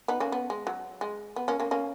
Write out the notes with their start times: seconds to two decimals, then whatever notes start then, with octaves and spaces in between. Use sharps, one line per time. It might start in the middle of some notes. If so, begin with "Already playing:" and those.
0.08 B3 D#4
0.20 A#3 C#4
0.32 B3
0.50 G#3
0.67 F#3
1.01 G#3
1.36 B3
1.48 A#3 C#4
1.60 A#3 C#4
1.71 A#3 C#4